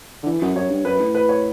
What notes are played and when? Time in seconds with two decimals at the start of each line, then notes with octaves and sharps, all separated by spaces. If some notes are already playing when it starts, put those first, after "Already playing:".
0.23 D3
0.26 E3
0.42 F#2
0.56 F#2 C#5
0.70 G2
0.85 F#2 B4
1.00 A2
1.15 B4
1.29 C#5